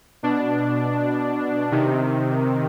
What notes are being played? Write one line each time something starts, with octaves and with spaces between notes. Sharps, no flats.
B2 D4
C3 D#3